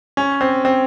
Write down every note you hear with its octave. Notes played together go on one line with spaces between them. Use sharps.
C#4
C4
C4